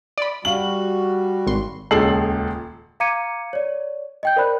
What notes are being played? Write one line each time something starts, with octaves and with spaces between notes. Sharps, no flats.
D5 B5
G3 F#4 F5 F#7
G#1 C6
D#1 C#2 G#4 A4 C7 F#7
F5 A#5 D6 G#6 C#7 D#7
C#5 D5
D#5 G5 G6
A#4 C5 D5 B5 F#6